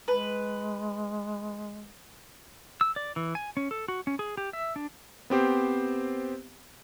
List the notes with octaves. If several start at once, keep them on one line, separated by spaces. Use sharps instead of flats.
G#3 B4
E6
D5
E3
G#5
C#4
A4
F#4
C#4
G#4
G4
E5
D4
B3 C4 G4 C5